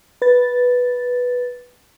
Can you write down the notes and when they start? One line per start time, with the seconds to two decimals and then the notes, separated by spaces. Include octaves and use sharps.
0.22 B4 A6